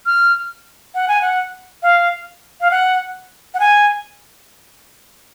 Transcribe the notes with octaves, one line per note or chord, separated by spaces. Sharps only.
F6
F#5
G#5
F#5
F5
F5
F#5
F#5
G#5